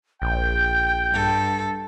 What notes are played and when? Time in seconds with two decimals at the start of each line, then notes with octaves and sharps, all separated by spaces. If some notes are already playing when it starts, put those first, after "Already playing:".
0.22 A#1 G5 G6
1.10 G2 A4